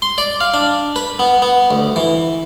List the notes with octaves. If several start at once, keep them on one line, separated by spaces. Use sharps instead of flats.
C6
D5
F5
D4
B4
B3
B3
D2
E3